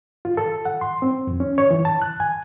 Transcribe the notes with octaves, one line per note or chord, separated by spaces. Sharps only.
F4
A4
F#5
C6
C4
F2
C#4
C#5
E3
A5
F#6
G#5